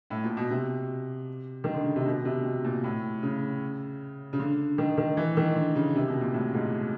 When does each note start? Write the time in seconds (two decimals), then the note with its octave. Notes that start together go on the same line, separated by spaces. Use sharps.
0.10 A2
0.24 A#2
0.37 B2
0.50 C3
1.64 D#3
1.74 D3
1.85 C#3
1.96 C3
2.06 B2
2.25 C3
2.44 B2
2.64 A#2
2.84 A2
3.23 C#3
4.33 C#3
4.39 D3
4.78 D#3
4.98 D#3
5.17 E3
5.37 D#3
5.56 D3
5.76 C#3
5.95 C3
6.08 B2
6.21 A#2
6.34 A2
6.54 G#2